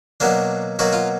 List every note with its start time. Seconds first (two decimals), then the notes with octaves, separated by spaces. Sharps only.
0.20 B2 F#3 A#3 D4
0.79 B2 F#3 A#3 F#4
0.93 F4